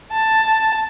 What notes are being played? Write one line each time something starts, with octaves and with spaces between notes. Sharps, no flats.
A5